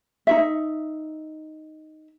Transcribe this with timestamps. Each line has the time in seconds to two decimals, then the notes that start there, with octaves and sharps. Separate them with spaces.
0.27 D#4 F4 E5